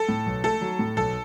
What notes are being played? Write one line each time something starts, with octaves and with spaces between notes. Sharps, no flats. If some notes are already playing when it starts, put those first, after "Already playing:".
Already playing: A4
A2
B1
A3 A4
F#3
A2
B1 A4